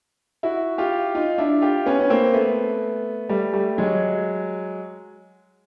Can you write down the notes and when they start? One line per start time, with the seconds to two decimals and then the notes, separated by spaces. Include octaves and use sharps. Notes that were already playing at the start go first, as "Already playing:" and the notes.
0.43 E4 F#4
0.78 F4 G4
1.15 D#4 F4
1.38 D4 E4
1.62 F4 G4
1.86 B3 C#4
2.00 C#4
2.10 A#3 C4
2.33 A3 B3
3.29 G3 A3
3.53 G3 A3
3.78 F#3 G#3